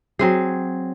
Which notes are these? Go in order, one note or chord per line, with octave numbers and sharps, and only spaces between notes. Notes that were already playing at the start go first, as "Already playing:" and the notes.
F#3 C4 G#4